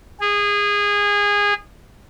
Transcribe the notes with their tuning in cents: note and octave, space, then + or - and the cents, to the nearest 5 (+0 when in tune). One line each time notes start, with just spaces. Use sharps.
G#4 -20